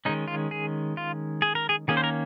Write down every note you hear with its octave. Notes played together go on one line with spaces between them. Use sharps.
D#3 G#3 C#4 D#4
F4
G#4
F4
G#4
A#4
G#4
D#3 A#3 C#4 G#4
C5
A#4